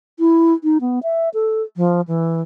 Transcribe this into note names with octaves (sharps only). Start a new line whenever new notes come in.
E4
D#4
B3
E5
A4
F3
E3